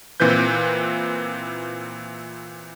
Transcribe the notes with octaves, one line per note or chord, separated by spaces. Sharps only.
A#2 E3 C4 B4 G6